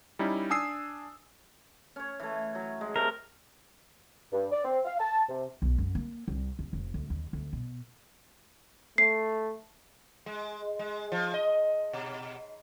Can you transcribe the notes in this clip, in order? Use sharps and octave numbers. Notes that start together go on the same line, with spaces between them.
G3 C#4 D#4 E4
D4 G#5 D#6 E6 C7
C#4 C#5
E3 A3
F#3
G#3
C3 A3 A#4
G2
D5
C4
F5
A5
C3
B1
F#2
A#3
C2
D#2
F1
D2
D#2
D2
B2
A3 C7
G#3
G#3
F3
D#5
B2